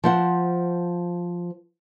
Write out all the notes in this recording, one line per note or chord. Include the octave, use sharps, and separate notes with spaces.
F3 C5 F#5